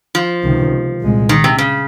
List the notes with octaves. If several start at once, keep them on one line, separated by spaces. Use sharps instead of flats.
F3
C#2 C3 D#3
C2 A#2 G#3
D#3
C3
C#3